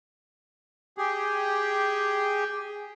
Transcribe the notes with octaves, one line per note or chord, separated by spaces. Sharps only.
G4 G#4